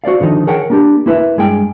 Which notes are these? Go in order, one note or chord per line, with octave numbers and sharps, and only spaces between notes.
F#4 C5 D5 F5
D3 D#3 F3 D#4
G#4 A#4 C#5 F#5 G5
A#3 D4 G4
A#3 E4 B4 E5
G2 G#3 G#4 G5